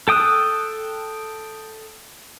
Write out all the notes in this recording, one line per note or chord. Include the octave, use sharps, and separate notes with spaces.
A4 G5 D#6 E6 F#6